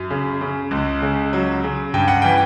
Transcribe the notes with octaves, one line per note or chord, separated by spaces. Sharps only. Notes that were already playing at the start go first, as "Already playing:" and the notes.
Already playing: F#2
C#3
C#3
C#2
C#3
F#3
C#3
G2 G5
F#5
E3 G5